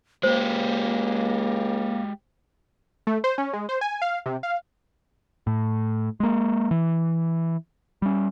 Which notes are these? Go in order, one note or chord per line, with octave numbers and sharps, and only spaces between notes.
C#2 G#3 A#3 G4 C5
A3
C5
C#4
G#3
C5
G#5
F5
C3
F5
A2
G#3 A#3
E3
G3 C#4